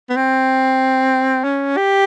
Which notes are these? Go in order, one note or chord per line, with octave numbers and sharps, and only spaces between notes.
B3
C4
C#4
G4